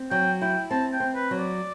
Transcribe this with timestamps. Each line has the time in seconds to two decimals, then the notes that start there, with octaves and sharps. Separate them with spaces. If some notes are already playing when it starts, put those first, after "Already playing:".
Already playing: C4
0.11 F#3 G5
0.42 E4 G5
0.71 C4 A5
0.93 G5
1.00 C4
1.15 B4
1.31 F#3
1.38 D5